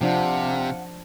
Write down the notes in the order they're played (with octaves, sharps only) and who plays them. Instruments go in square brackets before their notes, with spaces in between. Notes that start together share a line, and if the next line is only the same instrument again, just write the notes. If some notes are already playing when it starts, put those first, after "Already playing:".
[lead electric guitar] C3 [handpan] F3 D4 [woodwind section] C4 F5 F#5